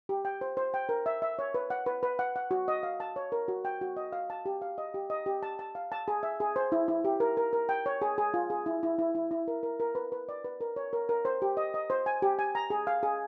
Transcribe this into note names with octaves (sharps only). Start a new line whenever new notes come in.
G4
G5
C5
C5
G5
A#4
E5
E5
C#5
B4
F#5
B4
B4
F#5
F#5
F#4
D#5
F5
A5
C#5
A#4
F#4
G5
F#4
D#5
F5
A5
G4
F5
D#5
G4
D#5
G4
A5
A5
F5
A5
G#4
E5
G#4
C5
E4
E4
G4
A#4
A#4
A#4
G5
C#5
G#4
G#4
F4
G#4
E4
E4
E4
E4
E4
A#4
A#4
A#4
B4
B4
D5
B4
A#4
C#5
A#4
A#4
C5
G4
D#5
D#5
C5
G#5
G4
G#5
A#5
G#4
F5
G#4